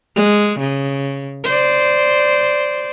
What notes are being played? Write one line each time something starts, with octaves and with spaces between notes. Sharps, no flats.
G#3
C#3
C5 D5